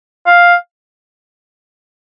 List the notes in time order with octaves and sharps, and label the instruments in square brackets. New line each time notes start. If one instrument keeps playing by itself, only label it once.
[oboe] F5